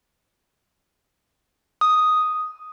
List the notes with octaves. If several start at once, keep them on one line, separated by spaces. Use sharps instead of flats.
D#6